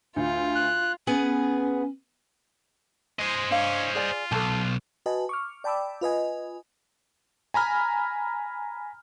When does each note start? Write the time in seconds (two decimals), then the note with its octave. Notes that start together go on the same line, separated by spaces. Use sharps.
0.16 D2 F4
0.55 F#6
1.07 B3 C#4 G#4 B4
3.19 G#3 C5 D#5
3.51 C#4 D4 F5
3.95 F4 G#4 D5 G#5
4.32 B1 A4 A5
5.06 F#4 B4 D#5 G#5 A5
5.29 C#6 D6 F6
5.64 D5 G5 A5 B5 D6 E6
6.01 F4 B4 D#5 G#5
7.54 G#5 A#5 B5 F6